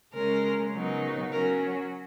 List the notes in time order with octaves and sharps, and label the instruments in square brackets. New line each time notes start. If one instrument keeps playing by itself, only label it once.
[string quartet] C#3 G#3 C#4 [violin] A#4
[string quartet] C#3 F#3 B3 D#4 A#4
[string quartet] F#3 C#4 F#4 [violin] A#4